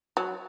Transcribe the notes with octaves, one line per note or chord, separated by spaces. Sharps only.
F#3